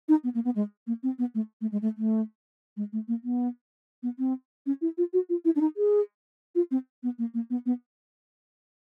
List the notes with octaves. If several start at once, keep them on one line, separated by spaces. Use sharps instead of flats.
D#4
B3
A#3
B3
G#3
A#3
C4
B3
A3
A3
G#3
A3
A3
G#3
A3
A#3
B3
B3
C4
C#4
E4
F4
F#4
F4
E4
D4
D#4
G#4
F4
C4
B3
A#3
A#3
B3
B3